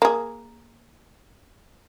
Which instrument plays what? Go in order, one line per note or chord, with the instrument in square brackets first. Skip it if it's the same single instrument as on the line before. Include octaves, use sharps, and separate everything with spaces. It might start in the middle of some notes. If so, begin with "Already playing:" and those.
[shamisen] A#3 G#4